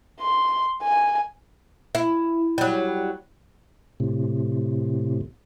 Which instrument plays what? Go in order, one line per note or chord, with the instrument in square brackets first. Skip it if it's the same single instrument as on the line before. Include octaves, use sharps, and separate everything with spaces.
[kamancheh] C6
G#5
[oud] E4
F#3 G3
[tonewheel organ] A2 C3